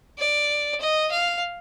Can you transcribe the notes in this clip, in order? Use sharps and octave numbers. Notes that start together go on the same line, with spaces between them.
D5
D#5
F5